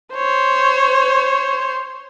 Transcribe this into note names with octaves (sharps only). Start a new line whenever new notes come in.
C5 C#5